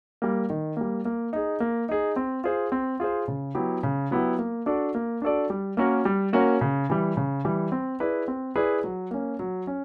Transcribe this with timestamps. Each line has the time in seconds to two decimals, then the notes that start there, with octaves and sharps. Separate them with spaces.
0.22 G3 A#3
0.50 D#3
0.77 G3 A#3
1.05 A#3
1.33 D#4 G#4
1.60 A#3
1.89 D#4 G#4
2.16 C4
2.44 F4 G#4 C5
2.72 C4
3.00 F4 G#4 C5
3.28 C#3
3.55 F#3 B3 E4 G4
3.83 C#3
4.11 F#3 B3 E4 G4
4.39 A#3
4.66 D4 F#4 A4 D5
4.95 A#3
5.22 D4 F#4 A4 D5
5.50 G3
5.77 A#3 C#4 F#4 A#4
6.05 G3
6.33 A#3 C#4 F#4 A#4
6.61 C#3
6.90 E3 G3
7.17 C#3
7.45 E3 G3
7.72 C4
8.00 E4 G#4 B4 D5
8.28 C4
8.56 E4 G#4 B4 D5
8.84 F#3
9.11 A#3 C#4
9.39 F#3
9.67 C#4